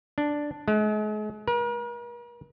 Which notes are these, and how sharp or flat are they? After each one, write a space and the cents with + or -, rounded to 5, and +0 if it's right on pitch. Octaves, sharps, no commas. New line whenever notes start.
D4 +0
G#3 +40
A#4 +45